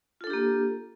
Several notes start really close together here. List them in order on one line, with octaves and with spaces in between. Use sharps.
F4 A4 D4 G4 A#3